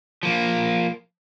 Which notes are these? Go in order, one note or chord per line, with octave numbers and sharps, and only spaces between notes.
F3 A#3